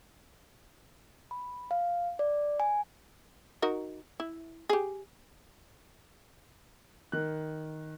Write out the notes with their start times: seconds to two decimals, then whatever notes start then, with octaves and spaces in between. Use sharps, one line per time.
1.31 B5
1.71 F5
2.19 D5
2.60 G#5
3.62 D#4 F#4 A#4
4.20 E4
4.69 G4 G#4
7.12 D#3 F#6